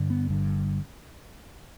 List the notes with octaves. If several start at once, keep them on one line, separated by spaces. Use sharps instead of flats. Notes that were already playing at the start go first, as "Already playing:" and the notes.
Already playing: G2 D3
B3
G1 G2 D3